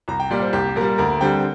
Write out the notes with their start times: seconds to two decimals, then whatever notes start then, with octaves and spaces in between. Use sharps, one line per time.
0.08 C2 A#5
0.20 G5
0.31 A#2 G3 D5
0.42 C5
0.53 C2 G4
0.76 A#2 G3 A#4
0.98 D2 A#4
1.21 D3 G3 C4 G5